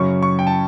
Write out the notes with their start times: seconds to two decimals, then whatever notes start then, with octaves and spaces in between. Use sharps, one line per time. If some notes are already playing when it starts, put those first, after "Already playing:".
Already playing: F#2 C#3 F#3 C#4 C#6
0.23 C#6
0.39 G5
0.47 A5